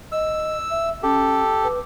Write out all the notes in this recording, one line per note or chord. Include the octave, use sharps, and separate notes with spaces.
D#5 E6
E5
C#4 G4 A4
B4